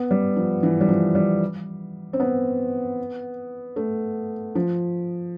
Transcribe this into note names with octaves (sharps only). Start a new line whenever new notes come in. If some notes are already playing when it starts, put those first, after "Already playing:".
Already playing: B3
G3
F3
E3
G3
F3
G3
C4
B3
A3
F3